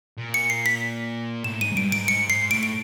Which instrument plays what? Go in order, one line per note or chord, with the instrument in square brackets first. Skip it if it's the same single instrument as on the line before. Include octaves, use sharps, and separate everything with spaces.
[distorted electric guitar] A#2
[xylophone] C#7
C7
B6
[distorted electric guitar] A2 [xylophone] E7
[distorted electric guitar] G#2 [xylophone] D#7
[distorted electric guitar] G#2
[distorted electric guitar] G2 [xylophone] D7
[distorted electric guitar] G#2 [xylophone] D7
[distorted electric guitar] G#2 [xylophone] C#7
[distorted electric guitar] G#2 [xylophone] C7
[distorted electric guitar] A2 [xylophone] D7
[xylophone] D7